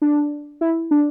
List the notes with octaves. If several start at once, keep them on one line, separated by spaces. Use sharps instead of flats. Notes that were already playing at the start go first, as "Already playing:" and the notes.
D4
E4
D4